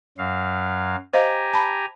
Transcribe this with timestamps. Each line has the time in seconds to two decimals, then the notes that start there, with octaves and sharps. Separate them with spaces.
0.18 F#2 F#3 F5
1.13 G4 C5 D#5 F5 G#5 A#5
1.53 A5 B5